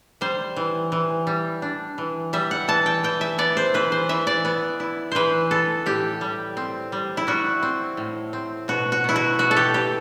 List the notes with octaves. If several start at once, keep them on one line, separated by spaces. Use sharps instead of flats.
G3 C5
E3
E3
G3
D4
E3
G3 E5
F#5
E3 A5
G5
E3 G5
E5
B3 D5
C5
E3 B4
C5
E3 E5
D5
B3
E4
E3 B4 C5
B3 A4
A2 G4
G3
C4
G3
E4
G3 F#4
C4
A2
C4
B2 F#4
F#4
B2 E4
F#4
B2 F#4
A4
G4
B2 G4